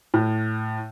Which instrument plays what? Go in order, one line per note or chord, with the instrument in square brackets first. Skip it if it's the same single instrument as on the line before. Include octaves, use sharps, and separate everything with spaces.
[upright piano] A2